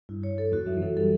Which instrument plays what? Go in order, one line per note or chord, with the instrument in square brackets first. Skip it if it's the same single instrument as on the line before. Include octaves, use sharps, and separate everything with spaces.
[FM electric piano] G2 [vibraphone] E4
[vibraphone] C#5
A4
[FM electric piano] E2 E3 [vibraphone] F#4
[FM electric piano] F#2 F#3 [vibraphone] E5
[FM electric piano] E3
[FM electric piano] F#2 F#3 [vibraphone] A4
[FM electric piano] G3 [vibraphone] A4